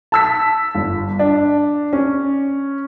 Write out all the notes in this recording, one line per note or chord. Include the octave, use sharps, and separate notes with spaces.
A5 E6 B6
G1
D4
C#4